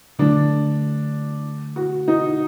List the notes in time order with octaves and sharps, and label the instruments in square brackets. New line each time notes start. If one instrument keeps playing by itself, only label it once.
[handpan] D3 F#3 A3 [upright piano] D4
[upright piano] F#4
D#4